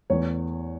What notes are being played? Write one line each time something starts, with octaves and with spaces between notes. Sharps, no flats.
E2 E3 A3 C#5